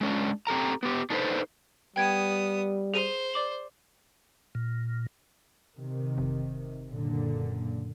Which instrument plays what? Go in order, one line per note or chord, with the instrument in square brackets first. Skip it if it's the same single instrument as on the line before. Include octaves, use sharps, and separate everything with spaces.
[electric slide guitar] G#3 C#4 D4
C4 G4 A4 A#5
B3 G4
D4 D#4 A4 B4 C5
[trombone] G3 [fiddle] B3 D#6 [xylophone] G5 G#6 D7
[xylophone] G#4 D#7 [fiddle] C5
[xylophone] D5 D6 F#7
[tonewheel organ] A#2
[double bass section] C3 D#3
[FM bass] F1
[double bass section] F#1 A#2 D3